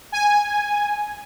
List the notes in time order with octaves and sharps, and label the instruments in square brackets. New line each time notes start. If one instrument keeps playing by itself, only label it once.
[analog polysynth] G#5